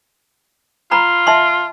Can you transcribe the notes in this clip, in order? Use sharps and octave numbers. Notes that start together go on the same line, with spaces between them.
F4 A#5 B5
E5 A5 C6